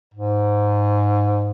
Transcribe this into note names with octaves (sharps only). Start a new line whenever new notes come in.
G#2